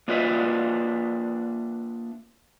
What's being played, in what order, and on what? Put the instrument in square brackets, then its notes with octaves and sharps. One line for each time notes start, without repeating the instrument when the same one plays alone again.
[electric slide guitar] A#3 D4 F4 B4 D#5 E5